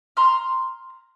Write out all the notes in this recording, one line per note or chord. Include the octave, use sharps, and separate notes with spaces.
A#5 C6 F6